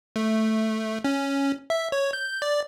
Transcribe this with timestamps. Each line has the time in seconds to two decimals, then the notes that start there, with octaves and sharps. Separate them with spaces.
0.16 A3
1.04 C#4
1.70 E5
1.92 C#5
2.13 G6
2.42 D5